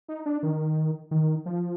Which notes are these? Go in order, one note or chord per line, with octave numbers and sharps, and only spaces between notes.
D#4
D4
D#3
D#3
F3